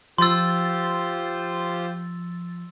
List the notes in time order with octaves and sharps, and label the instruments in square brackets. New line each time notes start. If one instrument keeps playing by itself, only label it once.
[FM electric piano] F3 A6 [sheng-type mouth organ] F4 G4 C5 [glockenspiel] C6 E6